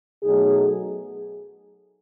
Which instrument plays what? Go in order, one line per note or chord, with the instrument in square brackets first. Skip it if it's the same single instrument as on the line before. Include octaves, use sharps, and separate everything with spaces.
[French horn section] B2 F#3 A3 D#4 G#4